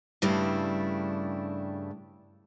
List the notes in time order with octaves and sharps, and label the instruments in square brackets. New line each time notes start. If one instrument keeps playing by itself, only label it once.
[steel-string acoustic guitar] G2 C#3 G3 A3 D4 E4